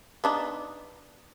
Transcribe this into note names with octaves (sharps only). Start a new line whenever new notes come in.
B3 D4 D#4